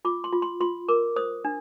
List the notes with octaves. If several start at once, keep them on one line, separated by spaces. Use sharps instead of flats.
F4 D6
C6
F4
C6
F4 C6
A#4 D6
C5 D#6
D4